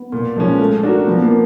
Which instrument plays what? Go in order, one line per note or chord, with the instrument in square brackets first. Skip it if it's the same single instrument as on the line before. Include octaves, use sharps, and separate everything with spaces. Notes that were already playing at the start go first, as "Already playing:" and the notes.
Already playing: [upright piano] B3
[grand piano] A#2
F3 G#3 C#4
A3
D4 F#4 A#4
[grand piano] F3 [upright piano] B3
[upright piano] A#3